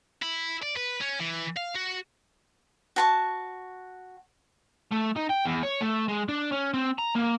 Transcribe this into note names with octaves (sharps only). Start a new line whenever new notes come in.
E4
D5
B4
C#4
E3
F5
F#4
F#4 A5 C#6
A3
D#4
G5
E2
C#5
A3
G#3
D4
C#4
C4
A#5
A#3